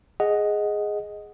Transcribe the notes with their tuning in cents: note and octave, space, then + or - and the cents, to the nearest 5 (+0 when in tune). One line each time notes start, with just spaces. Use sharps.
G#4 +0 D#5 +0 F#5 +0